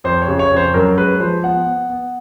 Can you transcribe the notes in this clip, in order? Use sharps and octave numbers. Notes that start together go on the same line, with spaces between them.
F2 C5
C#5
C#3
C#5
F2
C5
F#2 A#4
G#3 B4
F3 C5
B3 F#5
B3
B3